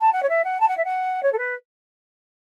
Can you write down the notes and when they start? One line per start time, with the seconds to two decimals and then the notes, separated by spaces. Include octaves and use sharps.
0.01 A5
0.12 F#5
0.22 C#5
0.29 E5
0.44 F#5
0.60 A5
0.68 F#5
0.77 E5
0.84 F#5
1.22 C#5
1.32 A4
1.38 B4